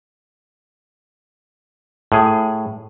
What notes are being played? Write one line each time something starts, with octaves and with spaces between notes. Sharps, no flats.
A2 G#4